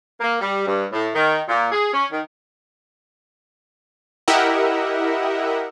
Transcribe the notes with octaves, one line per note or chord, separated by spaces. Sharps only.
A#3
G3
G2
A2
D#3
A#2
G#4
C#4
D#3
E4 G4 A#4 D#5 E5 F#5